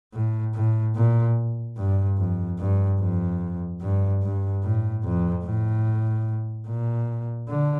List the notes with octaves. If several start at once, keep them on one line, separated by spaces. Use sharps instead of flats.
A2
A2
A#2
G2
F2
G2
F2
G2
G2
A2
F2
A2
A#2
D3